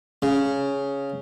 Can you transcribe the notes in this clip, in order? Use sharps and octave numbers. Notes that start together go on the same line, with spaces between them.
C#3